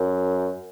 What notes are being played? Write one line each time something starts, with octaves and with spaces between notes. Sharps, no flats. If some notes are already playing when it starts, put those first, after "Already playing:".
Already playing: F#2